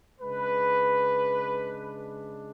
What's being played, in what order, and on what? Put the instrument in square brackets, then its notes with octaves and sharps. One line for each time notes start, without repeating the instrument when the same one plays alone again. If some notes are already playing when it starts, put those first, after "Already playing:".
[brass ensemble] C#3 G#3 D4 B4